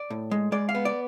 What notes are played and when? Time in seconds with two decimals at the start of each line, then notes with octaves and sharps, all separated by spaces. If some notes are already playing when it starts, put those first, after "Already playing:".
Already playing: D5
0.10 A2
0.31 G#3
0.52 G#3 D5
0.69 F5
0.75 B3
0.85 D5